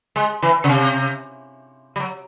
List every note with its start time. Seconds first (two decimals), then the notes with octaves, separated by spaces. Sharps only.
0.16 G#3
0.42 E3
0.64 C#3
0.69 C3
1.96 G3
2.00 F#3